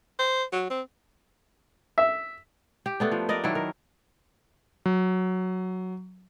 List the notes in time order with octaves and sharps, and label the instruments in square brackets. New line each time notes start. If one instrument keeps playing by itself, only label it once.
[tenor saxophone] C5
F#3
C4
[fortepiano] E5
[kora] G4
A3 B3 D4
F3
A#4 B4 D5 D#5
D#3 F#3 D4 E4
A#4
[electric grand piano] F#3